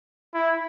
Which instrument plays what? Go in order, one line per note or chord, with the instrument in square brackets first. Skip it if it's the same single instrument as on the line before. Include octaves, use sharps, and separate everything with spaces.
[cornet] E4